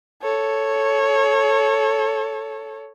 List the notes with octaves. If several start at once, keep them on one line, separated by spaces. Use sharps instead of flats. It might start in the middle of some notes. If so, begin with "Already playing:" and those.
A4 C#5